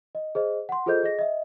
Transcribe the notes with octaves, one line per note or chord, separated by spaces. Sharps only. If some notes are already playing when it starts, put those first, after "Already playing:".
D#5
G#4 C5 D#5
F#5 C6
F4 G#4 A4 C5 D#5 G6
G#4 D#5 A#6
D#5 E5